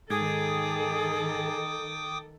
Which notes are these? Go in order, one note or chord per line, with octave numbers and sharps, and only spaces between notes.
G#2 D#3 G#4 A4 G5 D6 D#6 G#6